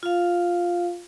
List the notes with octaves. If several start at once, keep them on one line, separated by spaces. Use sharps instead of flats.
F4 F5